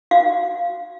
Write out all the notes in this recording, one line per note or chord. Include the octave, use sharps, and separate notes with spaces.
F#4 F5